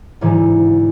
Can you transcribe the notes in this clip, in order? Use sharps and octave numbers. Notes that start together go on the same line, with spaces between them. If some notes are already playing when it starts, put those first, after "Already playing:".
D2 G#2 C3 E3